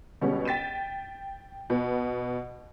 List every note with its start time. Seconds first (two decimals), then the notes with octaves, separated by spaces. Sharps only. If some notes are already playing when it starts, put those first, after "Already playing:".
0.21 B2 D3 G3 G#3 B3 C#4
0.45 G5 A6 B6 D#7 E7
1.70 B2 B3